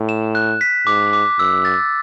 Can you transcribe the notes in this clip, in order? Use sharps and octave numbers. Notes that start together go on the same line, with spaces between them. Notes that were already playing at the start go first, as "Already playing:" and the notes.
Already playing: A2
E7
F#6
B6
G#2 D6
D6
F#2 E6
A6